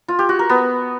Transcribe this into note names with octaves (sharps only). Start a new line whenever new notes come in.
F4
G4
F#4
A#4
B3